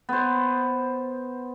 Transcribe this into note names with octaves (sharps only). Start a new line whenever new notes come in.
B3 C5